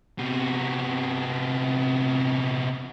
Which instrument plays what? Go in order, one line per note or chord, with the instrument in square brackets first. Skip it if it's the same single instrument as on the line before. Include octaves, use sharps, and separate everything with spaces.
[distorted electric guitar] C3 B3